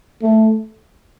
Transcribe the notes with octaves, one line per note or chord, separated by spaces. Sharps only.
A3